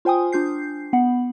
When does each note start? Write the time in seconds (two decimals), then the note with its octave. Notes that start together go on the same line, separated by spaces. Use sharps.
0.05 F4 C5 G5 G#5 D#6
0.32 D4 F4 G6 C7
0.93 B3 F#5